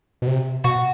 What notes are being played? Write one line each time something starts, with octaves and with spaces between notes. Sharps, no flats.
B2
C3
B2 F#4